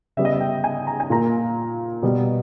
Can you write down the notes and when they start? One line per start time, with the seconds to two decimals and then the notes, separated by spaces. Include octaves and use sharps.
0.17 C#3 G3 B3 E5
0.25 D#5
0.33 E5
0.41 G5
0.64 G#5
0.87 A#5
1.00 G#5
1.10 A#2 A#3 A#5
2.02 B2 G3 B3